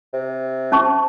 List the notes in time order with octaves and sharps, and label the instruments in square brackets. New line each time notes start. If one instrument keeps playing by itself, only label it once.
[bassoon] C3
[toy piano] C#4 A5 C#6